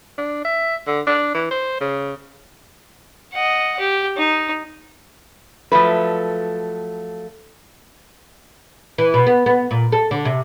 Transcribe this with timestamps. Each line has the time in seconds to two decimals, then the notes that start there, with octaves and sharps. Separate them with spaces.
0.18 D4
0.45 E5
0.87 D3
1.07 D4
1.35 E3
1.51 C5
1.81 C#3
3.32 D#5 F#5
3.79 G4
4.17 D#4
5.72 F3 F#3 A3 B4
8.98 E3
9.14 B2
9.27 B3
9.46 B3
9.71 A#2
9.92 A4
10.11 D3
10.25 C3